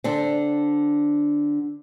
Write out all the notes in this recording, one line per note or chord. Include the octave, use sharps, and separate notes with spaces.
D3 C4 D4